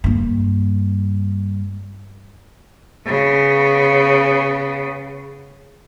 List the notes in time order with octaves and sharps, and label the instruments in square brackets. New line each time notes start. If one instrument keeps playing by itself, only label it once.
[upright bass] G2 A#3
[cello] C#3 B3